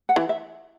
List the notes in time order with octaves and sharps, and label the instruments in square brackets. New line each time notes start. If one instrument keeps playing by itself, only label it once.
[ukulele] F#5
[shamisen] E3
[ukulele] E5